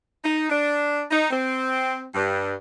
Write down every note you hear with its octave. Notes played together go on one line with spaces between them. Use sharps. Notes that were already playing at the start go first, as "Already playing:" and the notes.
D#4
D4
D#4
C4
G2